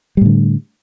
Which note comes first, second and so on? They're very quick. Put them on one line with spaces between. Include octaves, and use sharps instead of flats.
G3 A2 D3